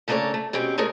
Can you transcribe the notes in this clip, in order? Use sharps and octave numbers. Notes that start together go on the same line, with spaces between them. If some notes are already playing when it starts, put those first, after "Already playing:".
C#3 A3 A#3 D4 A4 C#5
A3
B2 C4 C#4 G4 G#4
G#3 A3 G#4 A#4 C#5